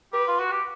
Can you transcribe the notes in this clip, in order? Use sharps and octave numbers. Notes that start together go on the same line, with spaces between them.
G4 B4
F4
F#4
G4